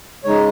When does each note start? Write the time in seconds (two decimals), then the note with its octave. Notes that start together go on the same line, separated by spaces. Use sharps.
0.24 C#3 G#3 D#4 C#5